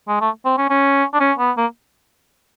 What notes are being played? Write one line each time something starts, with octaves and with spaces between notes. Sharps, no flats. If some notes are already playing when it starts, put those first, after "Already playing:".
G#3
A3
C4
C#4
C#4
D4
C#4
B3
A#3